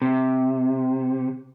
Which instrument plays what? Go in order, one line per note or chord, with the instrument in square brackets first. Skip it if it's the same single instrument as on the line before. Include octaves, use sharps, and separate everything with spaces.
[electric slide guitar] C3